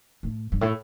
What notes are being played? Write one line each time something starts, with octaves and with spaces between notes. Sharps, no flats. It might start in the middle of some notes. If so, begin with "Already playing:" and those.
A2
G2
A2